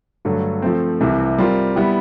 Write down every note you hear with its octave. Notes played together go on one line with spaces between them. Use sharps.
G2 D3 F#3 A3
F3 A3 C4
C2 C3 E3
G3 C4 F4 A#4
G3 B3 E4 G4